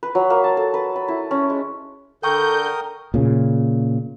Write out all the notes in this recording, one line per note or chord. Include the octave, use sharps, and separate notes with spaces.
B4
F#3
A#3
A5
A4
B4
B5
E4
C#4
G#3
D3 A4 A#4 G5 C#6 D#6 G6
A#2 C#3